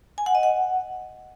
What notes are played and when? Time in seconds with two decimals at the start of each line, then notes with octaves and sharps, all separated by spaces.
0.18 G#5
0.26 F#5
0.35 D#5
0.43 F#5